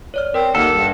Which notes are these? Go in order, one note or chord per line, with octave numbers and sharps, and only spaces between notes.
C#5 D5 F6
C4 A#4
D#2 A4 F#5 F6
G2